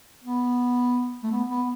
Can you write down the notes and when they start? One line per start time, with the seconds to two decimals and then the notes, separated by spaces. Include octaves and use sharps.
0.24 B3
1.23 A3
1.32 B3
1.50 B3